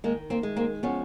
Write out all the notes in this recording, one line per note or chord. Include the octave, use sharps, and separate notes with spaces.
D#3 G#3 A#3
A#3 C4
G#3
A#3 C4
F3 B3 C#4